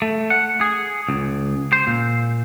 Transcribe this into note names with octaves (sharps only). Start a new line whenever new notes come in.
A3
F#5
G#4
C#2
C5
A#2